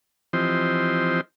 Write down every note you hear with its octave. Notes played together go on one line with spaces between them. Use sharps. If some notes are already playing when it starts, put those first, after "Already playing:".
E3 F3 C4 G4 C5 D#5